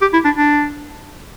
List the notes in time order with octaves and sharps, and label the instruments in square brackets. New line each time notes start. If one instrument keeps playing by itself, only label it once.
[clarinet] G4
E4
D4
D4